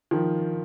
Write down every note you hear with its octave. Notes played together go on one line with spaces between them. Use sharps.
D#3 F3